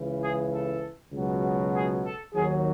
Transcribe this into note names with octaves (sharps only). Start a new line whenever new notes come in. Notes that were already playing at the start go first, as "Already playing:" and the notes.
Already playing: C#2 C#3 E3
G#4
A4
C#2 B2 F#3
G#4
A4
D#2 D#3 F#3 G#4